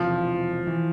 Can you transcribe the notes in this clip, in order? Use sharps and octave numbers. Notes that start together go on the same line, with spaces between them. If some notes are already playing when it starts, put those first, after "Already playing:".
Already playing: E1 C3 E3 F3
E3